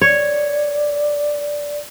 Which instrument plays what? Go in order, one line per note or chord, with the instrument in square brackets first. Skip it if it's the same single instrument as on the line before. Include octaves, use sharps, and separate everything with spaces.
[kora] C#5 [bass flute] D5